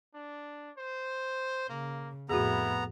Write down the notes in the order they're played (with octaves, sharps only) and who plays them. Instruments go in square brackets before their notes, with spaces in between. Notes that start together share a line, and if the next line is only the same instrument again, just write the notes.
[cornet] D4
C5
[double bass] C#3 [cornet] A#3
[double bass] F2 A2 [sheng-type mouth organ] B3 A#5 [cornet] E4 [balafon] F#4 G#4